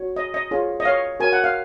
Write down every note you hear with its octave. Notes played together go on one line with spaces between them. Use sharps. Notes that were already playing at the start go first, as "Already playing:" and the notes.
Already playing: F#4 C#5
D#5
D#5
F4 G#4 C#5
D#5
C#5 F5
F#4 A#4 C#5 G#5
F#5
F5